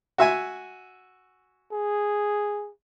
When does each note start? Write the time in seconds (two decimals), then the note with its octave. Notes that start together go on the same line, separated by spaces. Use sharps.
0.18 F#4 E5 G#5
1.72 G#4